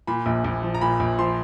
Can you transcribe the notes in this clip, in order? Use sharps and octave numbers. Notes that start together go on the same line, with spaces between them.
A#2 B5
A#1
A#1
F3
A#5
A#2 B5
A#1
F3 C6